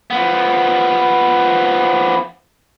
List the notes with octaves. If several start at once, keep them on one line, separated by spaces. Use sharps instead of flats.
F3 B3